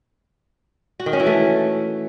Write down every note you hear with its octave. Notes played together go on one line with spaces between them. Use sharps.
F#4
D#3
C#4
E3
A3